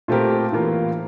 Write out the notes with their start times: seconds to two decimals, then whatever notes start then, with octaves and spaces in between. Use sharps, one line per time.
0.08 A#2 A3 C4 G4 A#4
0.52 A2 E3 A#3 F4 A#4